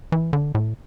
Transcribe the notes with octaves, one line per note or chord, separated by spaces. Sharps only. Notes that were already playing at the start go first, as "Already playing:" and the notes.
E3
D3
A2